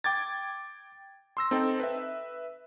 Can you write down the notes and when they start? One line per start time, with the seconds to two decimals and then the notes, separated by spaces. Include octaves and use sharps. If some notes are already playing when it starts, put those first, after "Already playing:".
0.04 G5 D6 G#6 A6
1.37 C6 E6 A#6
1.51 C4 D#4 A4 G5
1.80 B4 E5